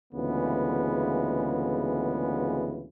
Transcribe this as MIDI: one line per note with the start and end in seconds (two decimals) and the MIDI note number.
0.14 2.89 38
0.14 2.89 46
0.14 2.89 49
0.14 2.89 52
0.14 2.89 56
0.14 2.89 59